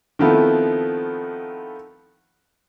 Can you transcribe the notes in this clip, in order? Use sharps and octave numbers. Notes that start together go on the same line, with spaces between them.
D#3 F3 A3 B3 C4 E4